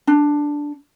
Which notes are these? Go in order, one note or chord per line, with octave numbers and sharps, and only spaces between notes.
D4